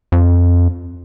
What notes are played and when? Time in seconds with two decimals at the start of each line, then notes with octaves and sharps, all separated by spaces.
0.12 F2